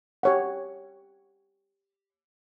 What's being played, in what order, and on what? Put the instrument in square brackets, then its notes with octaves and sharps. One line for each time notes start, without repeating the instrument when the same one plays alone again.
[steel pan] G4 C#5 F#5